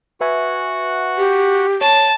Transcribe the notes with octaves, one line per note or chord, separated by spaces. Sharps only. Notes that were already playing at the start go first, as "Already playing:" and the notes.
F#4 B4 E5 F#5 G#5
G4
C#5 A5